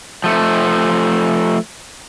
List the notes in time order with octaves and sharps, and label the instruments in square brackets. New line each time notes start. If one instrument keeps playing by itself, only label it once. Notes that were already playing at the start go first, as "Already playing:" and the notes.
[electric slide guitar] F3 A3